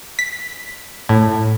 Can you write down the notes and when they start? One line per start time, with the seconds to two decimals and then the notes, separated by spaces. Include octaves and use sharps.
0.19 B6
1.09 A2